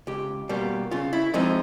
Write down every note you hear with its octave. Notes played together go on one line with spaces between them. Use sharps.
C#2 G4
B2 G3 A#3
C#3 F4
E4
F3 G#3 C4 D#4